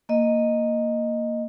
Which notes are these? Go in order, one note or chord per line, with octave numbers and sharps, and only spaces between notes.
A#3 D#5